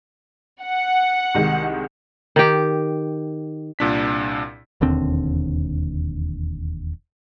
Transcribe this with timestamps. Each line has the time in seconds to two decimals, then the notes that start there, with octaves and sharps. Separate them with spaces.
0.61 F#5
1.35 C2 D#3 G#3
2.36 D#3 G4
3.79 C2 A#2 D4 B6
4.81 E1 D#2 D3 C4